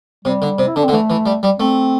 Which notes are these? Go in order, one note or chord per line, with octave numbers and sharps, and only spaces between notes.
C3 G3
D3
C3
E4
D3 D4
C4
D3
E3 A3
E3
G3
G3
A3 C4